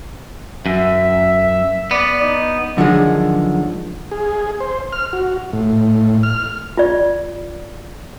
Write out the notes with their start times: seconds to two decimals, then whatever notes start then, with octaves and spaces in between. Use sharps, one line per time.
0.66 F#2 E5
1.91 B3 D5
2.22 D#4
2.77 F#2 D3 D#3 F3 G#3
4.11 G#4
4.60 C5
4.93 F6
5.13 F#4
5.53 A2
6.23 F6
6.77 F4 D5